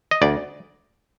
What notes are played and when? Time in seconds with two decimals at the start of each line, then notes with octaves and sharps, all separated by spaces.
0.11 D#5
0.22 D2 D5